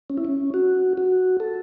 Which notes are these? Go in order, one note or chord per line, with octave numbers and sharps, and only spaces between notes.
C#4
E4
C#4
F#4
F#4
A4